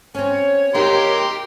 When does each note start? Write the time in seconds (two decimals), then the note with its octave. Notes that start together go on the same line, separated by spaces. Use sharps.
0.15 C4 C#4 C#5
0.75 A#3 D#4 G4 A#4 G5 C6